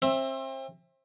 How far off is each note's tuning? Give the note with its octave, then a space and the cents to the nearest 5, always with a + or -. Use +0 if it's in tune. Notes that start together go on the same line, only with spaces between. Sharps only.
C4 +30 E5 +0